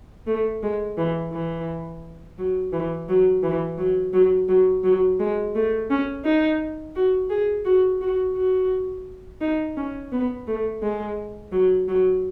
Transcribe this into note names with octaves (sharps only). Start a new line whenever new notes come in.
A3
G#3
E3
E3
F#3
E3
F#3
E3
F#3
F#3
F#3
F#3
G#3
A3
C#4
D#4
F#4
G#4
F#4
F#4
F#4
D#4
C#4
B3
A3
G#3
F#3
F#3